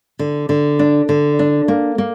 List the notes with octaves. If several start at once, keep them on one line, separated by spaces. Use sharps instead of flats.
D3
D3
D4
D3
D4
A#3
A#3